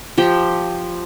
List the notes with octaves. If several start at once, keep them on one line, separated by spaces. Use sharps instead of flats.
F3 G4 G5